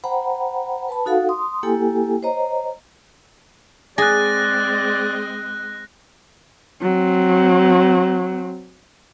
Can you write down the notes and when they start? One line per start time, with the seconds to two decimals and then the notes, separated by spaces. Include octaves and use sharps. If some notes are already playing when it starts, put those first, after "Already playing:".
0.04 C5 F#5 G5 A#5 B5
0.88 B4 A5 B5
1.06 D#4 F#4 A4 F5 F#5
1.29 C6 D#6
1.63 A#3 E4 G4 A4 G5 G#5
2.23 C5 C#5 D#5 A#5
3.98 G#3 C4 G#4 D5 D#5 F#6 A#6
6.82 F#3 C4